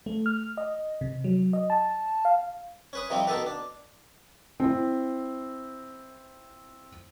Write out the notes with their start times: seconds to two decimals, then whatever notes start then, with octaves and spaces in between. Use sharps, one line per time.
0.06 A3
0.26 F6
0.57 D#5
1.01 C3
1.24 F#3
1.53 D#5
1.70 A5
2.25 F5
2.93 C#4 B4 D#6
3.10 C3 D#3 F3 G3 C4
3.27 B2 D#3 B3 A4 B4
3.46 D4
4.60 C4 E4